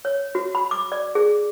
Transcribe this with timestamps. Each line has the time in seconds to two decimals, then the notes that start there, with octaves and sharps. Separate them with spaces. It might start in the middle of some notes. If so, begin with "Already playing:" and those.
0.05 C#5
0.35 F#4
0.55 B5
0.71 D6
0.92 D5
1.15 G#4